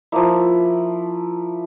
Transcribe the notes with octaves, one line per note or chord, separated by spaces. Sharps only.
F3 A#3 E4